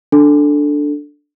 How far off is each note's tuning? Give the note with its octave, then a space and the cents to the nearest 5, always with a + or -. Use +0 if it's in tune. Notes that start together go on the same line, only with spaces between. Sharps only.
D4 +0 A4 +0